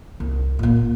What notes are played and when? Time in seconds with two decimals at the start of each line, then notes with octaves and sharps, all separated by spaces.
0.20 C2
0.59 A#2 A#3